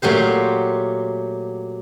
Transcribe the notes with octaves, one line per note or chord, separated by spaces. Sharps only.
A#2 F#3 A3 G4 C5